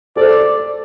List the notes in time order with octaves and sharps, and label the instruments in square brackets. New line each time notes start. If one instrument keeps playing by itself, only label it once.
[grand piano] A4 C5 [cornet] D5